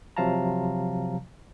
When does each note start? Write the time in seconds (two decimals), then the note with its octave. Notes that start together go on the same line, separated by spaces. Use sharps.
0.17 C3 F3 F#3 F5 A5 A#5